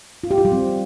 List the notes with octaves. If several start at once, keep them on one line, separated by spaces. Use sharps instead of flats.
F4
G4
F4
G3
C4